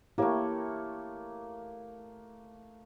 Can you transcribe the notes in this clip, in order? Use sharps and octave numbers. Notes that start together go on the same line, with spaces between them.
A3 A#3 E4 G4 C#5